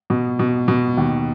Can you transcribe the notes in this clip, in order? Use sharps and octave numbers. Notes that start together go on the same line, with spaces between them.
B2
B2
B2
D#2